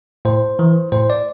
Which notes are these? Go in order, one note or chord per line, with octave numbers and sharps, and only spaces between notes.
A2 C5
E3
A2 C5
D5